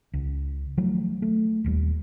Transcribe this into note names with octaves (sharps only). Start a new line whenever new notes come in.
C#2
D#3 F3 F#3 A3
A3
D#1 D#2 G3